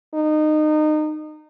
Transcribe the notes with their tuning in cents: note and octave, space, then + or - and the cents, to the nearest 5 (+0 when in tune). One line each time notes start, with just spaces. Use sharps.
D#4 -25